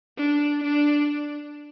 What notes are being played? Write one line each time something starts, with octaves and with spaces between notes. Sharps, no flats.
D4
D4